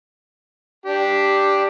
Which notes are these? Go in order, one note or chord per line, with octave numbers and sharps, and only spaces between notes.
D4 G4